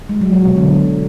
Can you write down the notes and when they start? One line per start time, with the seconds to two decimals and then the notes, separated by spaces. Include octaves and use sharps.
0.09 G#3
0.21 F#3
0.33 F#3
0.45 B2
0.57 D3